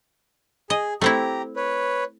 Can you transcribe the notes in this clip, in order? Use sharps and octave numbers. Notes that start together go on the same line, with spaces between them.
G#4 D#5
A3 C4 E4 G4 A#5
B4 C#5